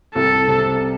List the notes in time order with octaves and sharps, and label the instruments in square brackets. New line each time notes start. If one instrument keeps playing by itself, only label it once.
[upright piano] C2 [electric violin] A4
[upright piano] C3